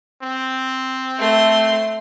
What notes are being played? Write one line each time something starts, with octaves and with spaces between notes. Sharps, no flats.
C4
A3 C6